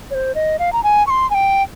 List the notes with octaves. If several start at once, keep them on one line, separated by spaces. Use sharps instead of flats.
C#5
C5
D#5
F5
A#5
G#5
C#6
C6
G#5
G5